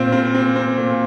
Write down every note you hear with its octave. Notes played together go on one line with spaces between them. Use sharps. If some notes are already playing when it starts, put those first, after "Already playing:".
Already playing: A#2 C4 F4
C4
C4
C4
A#2